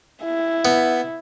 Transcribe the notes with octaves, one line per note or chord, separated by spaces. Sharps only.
E4
B3